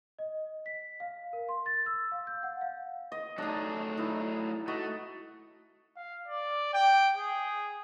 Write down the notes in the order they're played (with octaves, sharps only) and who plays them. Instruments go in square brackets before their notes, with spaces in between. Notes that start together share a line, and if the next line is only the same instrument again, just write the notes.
[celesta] D#5
B6
F5
A#4
C6
A6
E6
F5
G6
F#5
F5
[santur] D#5
[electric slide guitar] F#3 A3 G#4 [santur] D4 D#4
[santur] D#4 E4
[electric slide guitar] A3 [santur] F#4 D#5
[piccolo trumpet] F5
D5
G5
G#4